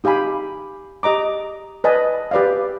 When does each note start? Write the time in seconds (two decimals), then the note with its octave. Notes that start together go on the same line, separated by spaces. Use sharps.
0.04 D#4 G4 F5 G#5 B5
1.03 G4 D#5 A#5 D6
1.84 B4 D5 D#5 G#5 A5 B5
2.31 G4 B4 D5 E5 F5